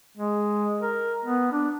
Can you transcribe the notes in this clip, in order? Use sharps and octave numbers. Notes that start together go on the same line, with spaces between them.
G#3
A#4
B3
D4